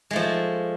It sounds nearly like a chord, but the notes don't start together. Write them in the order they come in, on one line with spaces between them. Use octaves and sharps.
G#3 A3 F3